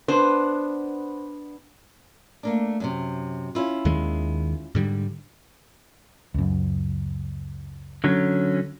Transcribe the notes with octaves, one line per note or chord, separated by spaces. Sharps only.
B3 D4 C5
A3 A#3 D4
F#2 A2 C3
C#4 E4 F4
D#2 D#3 G#3
G#2 D3 G3
C#2 F#2
D3 F#3 C#4